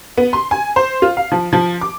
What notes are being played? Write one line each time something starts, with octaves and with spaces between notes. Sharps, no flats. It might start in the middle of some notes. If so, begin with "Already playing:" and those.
B3
C6
G#5
C5
F4
F5
F3
F3
D6